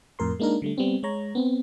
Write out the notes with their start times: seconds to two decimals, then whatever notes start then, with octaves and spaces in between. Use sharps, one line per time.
0.19 F2 A2 A#4 C6
0.40 G#3 A#3 D4 D#4 A#4
0.62 D3 G3 A3
0.78 G3 B3 C4
1.03 G#3 C#5 A#5
1.35 B3 C4